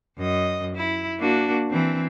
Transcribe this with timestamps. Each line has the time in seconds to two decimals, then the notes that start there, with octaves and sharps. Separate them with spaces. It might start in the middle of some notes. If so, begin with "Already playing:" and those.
0.18 F#2 D#5
0.75 E4
1.19 A#3 D4 F#4
1.70 E3 C4